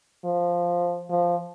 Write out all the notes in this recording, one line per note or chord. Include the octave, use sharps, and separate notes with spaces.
F3
F3